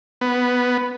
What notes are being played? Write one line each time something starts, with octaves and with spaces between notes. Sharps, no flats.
B3